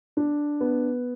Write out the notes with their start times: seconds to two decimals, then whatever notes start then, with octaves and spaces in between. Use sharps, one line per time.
0.17 D4
0.60 B3